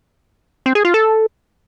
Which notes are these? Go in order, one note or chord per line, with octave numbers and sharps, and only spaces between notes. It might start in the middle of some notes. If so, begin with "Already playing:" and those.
C4
G#4
F4
A4